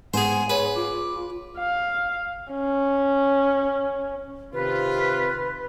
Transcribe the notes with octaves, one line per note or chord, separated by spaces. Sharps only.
G#2 B3 G#4 C5 F#5 G#5
G#4 B4 C#5
F4 D6
F5
C#4
C3 D#3 F4 B4